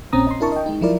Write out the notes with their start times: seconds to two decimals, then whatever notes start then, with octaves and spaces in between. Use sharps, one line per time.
0.13 A#1 A#2 C4 C#4 A#5 D#6
0.27 D#5 A#5 C6
0.40 D4 E4 A#4 A5 C#6
0.52 D#5 G5
0.66 G#3 D#4
0.81 F3 F#3 E4 F4 A#4 D5